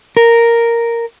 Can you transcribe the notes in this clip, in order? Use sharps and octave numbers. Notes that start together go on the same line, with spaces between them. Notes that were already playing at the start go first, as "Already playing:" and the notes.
A#4